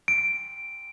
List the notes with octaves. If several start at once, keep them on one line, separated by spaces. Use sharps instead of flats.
D7